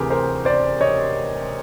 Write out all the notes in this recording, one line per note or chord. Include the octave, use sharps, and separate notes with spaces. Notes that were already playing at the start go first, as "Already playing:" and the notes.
Already playing: D2 C3 E3 G4 G#4 A#4
A#4 C5
C5 D5
C#5 D#5